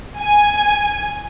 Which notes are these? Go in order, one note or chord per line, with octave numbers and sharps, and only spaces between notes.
G#5